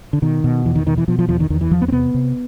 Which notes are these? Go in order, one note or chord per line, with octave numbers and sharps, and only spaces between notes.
D3
B2 D#3
B2
E2 E3
D#3
B2 D#3
E3
B2 F3
F3
E2 F3
D#3
E2 D#3
E3
E2 F3
B3
C4
C3 B3
C3